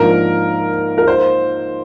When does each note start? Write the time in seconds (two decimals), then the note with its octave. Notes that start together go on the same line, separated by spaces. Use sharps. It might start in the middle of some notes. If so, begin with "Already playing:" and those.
Already playing: G#2 F3 A#3 D4 A#4
0.98 A#4
1.08 C5